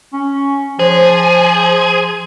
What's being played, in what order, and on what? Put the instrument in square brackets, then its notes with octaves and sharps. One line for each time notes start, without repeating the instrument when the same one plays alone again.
[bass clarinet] C#4
[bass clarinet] F3 [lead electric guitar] G#4 [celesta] C5 C#5